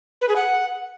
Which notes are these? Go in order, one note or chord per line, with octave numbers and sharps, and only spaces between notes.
B4
G#4
F#5